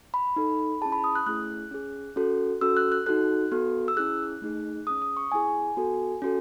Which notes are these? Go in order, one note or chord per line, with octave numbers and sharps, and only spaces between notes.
B5
D#4 A4
C#4 E4 G#4 A5
B5
D#6
F#6
A3 C#4 E4 G#4 F#6
C#4 G#4
C#4 F#4 A4
C#4 F#4 A4 E6
F#6
F#6
D#4 F#4 A4 F#6
B3 F#4 A4
E6
C#4 E4 G#4 F#6
A3 D#4 G#4
C#4 G#4 D#6
D#6
C#6
B3 E4 G#4 G#5
B3 F#4 A4
C#4 F#4 A4